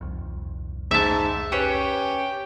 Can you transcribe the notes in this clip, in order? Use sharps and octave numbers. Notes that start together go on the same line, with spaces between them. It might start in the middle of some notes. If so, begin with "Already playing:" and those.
D#1 C2 F2
G#2 E5 A5
C#4 G4 B4 C#5